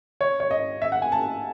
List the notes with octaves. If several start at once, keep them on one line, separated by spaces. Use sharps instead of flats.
C#5
C#5
D#5
E5
F#5
G#5
A5